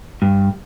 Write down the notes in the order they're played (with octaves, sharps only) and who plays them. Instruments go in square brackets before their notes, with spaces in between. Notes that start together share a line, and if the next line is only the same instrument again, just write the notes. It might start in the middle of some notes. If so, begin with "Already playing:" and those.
[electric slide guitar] G2